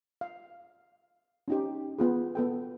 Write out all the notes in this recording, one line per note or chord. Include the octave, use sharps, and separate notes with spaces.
F5
C#4 D#4 G4
B3 F4 G#4
B3 A4 G5